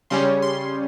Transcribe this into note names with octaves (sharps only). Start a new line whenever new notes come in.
C#3 G3 C#4 C6
C6